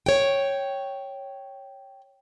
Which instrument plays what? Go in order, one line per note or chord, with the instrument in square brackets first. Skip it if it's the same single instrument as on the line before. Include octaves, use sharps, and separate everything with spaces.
[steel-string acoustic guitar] C#5 G5